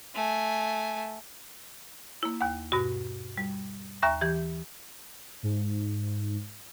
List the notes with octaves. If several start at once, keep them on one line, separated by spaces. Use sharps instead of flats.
A3 G#5
A#3 E4
D#2 F#5
G2 B2 F#4
G3
D#2 E5 A#5 C#6 A#6
E3 G4 G6
G#2